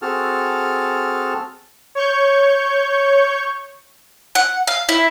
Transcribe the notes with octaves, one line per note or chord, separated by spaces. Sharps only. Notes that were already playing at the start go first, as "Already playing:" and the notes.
C4 F#4 G#4 A4 A5 F6
C#5 C#6 G6
F#5
F5
E4